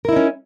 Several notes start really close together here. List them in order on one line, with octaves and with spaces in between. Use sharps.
A#4 E4 D#4 C#4